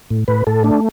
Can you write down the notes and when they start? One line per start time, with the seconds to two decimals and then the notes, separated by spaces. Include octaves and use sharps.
0.10 A2
0.28 A2 B4
0.47 A2 A4
0.64 A3 D4